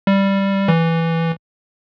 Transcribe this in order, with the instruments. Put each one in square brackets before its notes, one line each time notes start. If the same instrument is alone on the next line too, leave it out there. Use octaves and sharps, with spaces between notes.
[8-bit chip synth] G3
E3